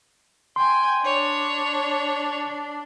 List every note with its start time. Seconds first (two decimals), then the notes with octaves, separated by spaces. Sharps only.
0.56 G5 G#5 C6
1.05 D4 C#5